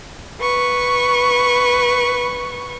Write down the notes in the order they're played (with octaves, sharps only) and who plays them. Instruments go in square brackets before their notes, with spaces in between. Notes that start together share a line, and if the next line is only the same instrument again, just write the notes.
[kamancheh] B4 C#6